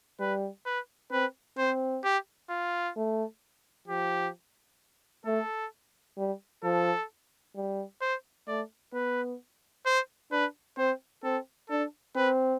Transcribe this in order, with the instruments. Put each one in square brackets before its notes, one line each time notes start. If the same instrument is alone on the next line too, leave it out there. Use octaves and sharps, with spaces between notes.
[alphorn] G3 [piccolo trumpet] B4
[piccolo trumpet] B4
[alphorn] C4 [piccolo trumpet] B4
[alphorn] C4 [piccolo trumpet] C5
[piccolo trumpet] G4
F4
[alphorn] A3
[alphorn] F3 [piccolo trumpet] G4
[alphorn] A3 [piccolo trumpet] A4
[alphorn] G3
[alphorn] F3 [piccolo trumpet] A4
[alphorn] G3
[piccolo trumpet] C5
[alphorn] A3 [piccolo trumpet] D5
[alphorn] B3 [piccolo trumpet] B4
[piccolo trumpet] C5
[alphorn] D4 [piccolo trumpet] B4
[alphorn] C4 [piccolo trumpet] C5
[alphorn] C4 [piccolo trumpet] A4
[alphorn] D4 [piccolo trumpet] A4
[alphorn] C4 [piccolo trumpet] B4